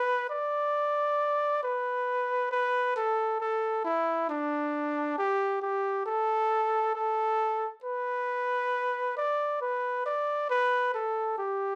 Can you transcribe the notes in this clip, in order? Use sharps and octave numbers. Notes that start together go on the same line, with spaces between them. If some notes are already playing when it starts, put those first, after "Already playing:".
Already playing: B4
D5
B4
B4
A4
A4
E4
D4
G4
G4
A4
A4
B4
D5
B4
D5
B4
A4
G4